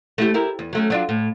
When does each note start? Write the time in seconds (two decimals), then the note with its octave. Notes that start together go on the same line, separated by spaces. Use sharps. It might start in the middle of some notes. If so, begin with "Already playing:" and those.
0.18 A3 E4 G4
0.34 E4 G4 A#4
0.59 E2
0.73 F#3 A3 C#4
0.90 F#3 D4 F4
1.09 A2